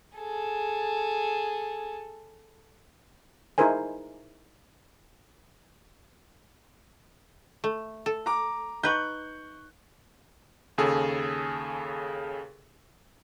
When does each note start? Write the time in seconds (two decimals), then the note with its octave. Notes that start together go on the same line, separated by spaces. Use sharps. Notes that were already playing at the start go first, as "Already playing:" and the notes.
0.17 G#4 A4
3.58 D#4 E4 G#4 A#4 C5 G#5
7.64 A3
8.06 A4
8.26 A#5 D6
8.83 D#4 B4 C#6 F#6 G6
10.78 D#2 C#3 G#4 A4